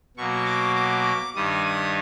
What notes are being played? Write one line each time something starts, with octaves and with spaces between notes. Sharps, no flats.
B2 F#3 A#3 C#6
D6
D6
G2 D#3 G3 D#6
D#6